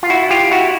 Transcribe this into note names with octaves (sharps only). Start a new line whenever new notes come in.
F4
E4 F#4
F4 G4
E4 F#4